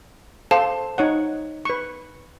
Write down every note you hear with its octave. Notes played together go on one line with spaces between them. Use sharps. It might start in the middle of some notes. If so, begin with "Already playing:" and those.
A4 C5 F5 A5
D#4 C#5 F#5
B4 C#6